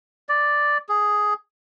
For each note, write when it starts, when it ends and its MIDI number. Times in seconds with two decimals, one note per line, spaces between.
0.29 0.78 74
0.89 1.34 68